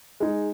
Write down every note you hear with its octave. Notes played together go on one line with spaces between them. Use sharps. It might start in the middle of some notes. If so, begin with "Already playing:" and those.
G#3 D#4 G#4